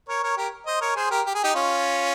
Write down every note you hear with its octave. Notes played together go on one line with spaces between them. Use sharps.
A#4 C#5
A#4 C#5
G4 A#4
C5 D#5
A#4 C#5
G#4 C5
G4 A#4
G4
G#4
D#4 G4
C#4 F4